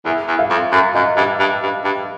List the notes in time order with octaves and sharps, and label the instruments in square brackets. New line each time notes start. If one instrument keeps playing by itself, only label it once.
[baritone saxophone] E2 [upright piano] E5
[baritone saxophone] E2
[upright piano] F5
[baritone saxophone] F2
[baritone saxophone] F#2 [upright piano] E5
[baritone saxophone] F#2 [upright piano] D#5
[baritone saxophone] G2 [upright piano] F5
[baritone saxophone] G2
G2
G2